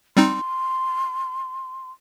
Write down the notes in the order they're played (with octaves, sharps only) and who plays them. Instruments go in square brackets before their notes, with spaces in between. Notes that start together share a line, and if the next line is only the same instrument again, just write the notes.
[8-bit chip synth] G3 C4 D#4 [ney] C6